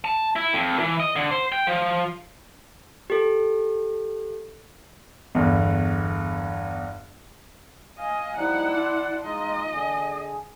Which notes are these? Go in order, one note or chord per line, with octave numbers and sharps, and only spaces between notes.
A5
E4
F2
E3
D#5
D3
C5
G5
F3
G4 A4
G1 E2
D#5 F5 G#5
F3 G3 D#4 E4 F#5
D5 A5 C6
G#3 D#4 F4 D#5
D3 G#4